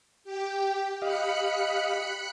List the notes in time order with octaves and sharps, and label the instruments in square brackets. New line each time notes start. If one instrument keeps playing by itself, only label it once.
[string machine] G4 G5
[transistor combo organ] G4 D#5 F5 [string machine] B5 F#6 C#7